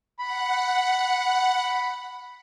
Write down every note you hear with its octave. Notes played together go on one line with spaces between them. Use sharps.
F#5 B5